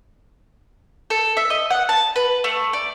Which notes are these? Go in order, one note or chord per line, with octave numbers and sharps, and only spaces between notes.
A4
E5
D#5
F#5
A5
B4
A3
D5